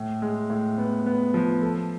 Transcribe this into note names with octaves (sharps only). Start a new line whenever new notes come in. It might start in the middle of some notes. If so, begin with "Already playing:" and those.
Already playing: A2
G#3
A2
B3
B3
F3
A4